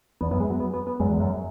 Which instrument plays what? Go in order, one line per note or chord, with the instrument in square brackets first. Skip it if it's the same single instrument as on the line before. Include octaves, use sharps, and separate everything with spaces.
[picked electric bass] E2 [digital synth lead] B3
[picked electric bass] F#2 [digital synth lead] B3
[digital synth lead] G#3
F#3
B3
B3
B3
[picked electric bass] F#2 [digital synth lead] G#3
[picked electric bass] E2
F#2